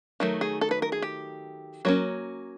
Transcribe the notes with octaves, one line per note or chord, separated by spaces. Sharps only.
D#3 F#3 A3
G#4
A4
B4
A#4
G#4
G4
F#3 A#3 C#4 C#5